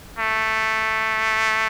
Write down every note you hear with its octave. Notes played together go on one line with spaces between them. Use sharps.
A3